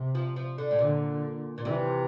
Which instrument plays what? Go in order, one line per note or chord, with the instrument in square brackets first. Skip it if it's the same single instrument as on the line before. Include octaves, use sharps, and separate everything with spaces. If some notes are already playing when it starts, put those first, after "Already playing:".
Already playing: [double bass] C3
[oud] F3
F3
D3
A2
[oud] A#2 [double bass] D3
[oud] A#2
[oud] C3 [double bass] E3